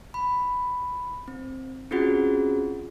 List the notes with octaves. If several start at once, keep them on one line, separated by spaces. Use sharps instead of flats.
B5
C4
C4 C#4 F4 F#4 G#4 F#5